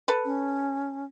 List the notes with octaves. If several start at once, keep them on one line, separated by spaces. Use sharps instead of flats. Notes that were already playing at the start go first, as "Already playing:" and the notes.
A4 B4
C#4